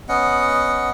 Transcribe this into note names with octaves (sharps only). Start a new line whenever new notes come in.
B3 C#4 D#5 F#5